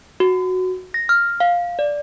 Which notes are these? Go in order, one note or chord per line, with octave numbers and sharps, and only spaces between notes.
F#4
A#6
F6
F5
D5